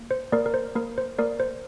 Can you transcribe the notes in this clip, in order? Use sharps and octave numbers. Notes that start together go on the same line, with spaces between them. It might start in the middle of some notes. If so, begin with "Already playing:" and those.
Already playing: A#3
C5
A#3 A#4 D5
A#4
C5
A#3 A#4
C5
A#3 A#4 D5
C5